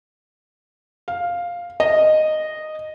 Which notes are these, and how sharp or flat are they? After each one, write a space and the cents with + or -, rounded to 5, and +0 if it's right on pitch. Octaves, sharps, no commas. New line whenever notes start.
F5 +5
D#5 -10